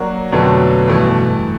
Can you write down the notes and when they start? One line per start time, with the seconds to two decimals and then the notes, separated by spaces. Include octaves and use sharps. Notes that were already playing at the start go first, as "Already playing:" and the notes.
Already playing: F#3 A#3 D4 F#4
0.32 F2 B2 D3 F#3 A3
0.88 G2 E3 A3